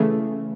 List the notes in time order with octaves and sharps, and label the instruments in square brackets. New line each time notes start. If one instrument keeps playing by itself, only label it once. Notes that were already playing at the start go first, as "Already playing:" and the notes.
Already playing: [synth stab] C#3 E3 A3